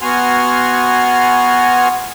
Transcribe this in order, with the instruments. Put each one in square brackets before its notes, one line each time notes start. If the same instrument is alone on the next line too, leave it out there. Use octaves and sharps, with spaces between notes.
[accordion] B3 F#4 F#5 G#5 C6 F6